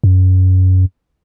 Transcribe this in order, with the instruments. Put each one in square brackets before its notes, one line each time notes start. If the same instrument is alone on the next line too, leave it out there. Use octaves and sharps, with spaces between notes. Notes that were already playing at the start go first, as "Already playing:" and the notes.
[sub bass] F#2